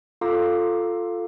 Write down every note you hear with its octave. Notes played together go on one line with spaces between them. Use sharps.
F4 A4 F5 A#5 D6 E6